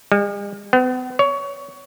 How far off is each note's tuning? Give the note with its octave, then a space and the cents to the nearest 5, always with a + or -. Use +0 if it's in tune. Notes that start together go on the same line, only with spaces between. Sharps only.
G#3 -45
B3 +40
C#5 +20